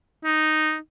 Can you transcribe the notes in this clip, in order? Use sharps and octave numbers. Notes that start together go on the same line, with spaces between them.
D#4